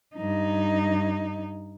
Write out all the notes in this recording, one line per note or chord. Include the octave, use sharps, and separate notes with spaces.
G2 D#4